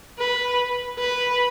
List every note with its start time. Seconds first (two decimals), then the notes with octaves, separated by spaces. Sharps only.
0.19 B4
0.99 B4